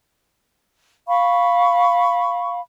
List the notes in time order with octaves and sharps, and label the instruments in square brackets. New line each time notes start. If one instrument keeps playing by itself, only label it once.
[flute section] F5 B5 C#6